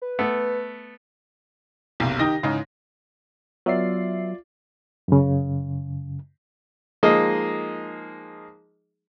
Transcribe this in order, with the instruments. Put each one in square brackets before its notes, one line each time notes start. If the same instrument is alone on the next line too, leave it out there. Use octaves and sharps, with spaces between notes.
[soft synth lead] B4
[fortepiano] A3 B3
[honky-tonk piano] F#1 B1 C3
D#3 D#4 G4 D#6 A#6
G#2 C#3 E3 D#4
[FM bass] F#3 [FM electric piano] B3 E5 C7 [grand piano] F4 D5
[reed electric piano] F#2 C#3
[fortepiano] F3 G#3 A#3 D#4 G#4 D#5